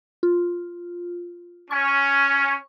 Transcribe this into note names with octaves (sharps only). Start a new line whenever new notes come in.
F4
C#4 C#6